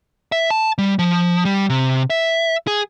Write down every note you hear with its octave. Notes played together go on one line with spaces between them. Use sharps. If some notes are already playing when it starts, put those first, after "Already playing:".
E5
A5
G3
F3
G3
C3
E5
G#4